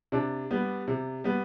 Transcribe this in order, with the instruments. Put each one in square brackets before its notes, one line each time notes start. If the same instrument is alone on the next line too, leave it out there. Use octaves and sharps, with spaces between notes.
[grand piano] C3 D4
G3 B3
C3
G3 B3